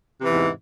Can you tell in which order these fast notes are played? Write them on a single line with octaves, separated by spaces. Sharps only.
C3 E3 E2 G#2